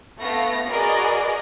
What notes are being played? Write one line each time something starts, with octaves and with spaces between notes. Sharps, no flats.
A3 B3 F5 A#6
F#4 G#4 A#4 B4 D5 D#5